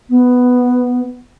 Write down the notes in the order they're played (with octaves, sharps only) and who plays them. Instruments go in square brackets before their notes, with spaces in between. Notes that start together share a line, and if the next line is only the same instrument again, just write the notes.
[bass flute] B3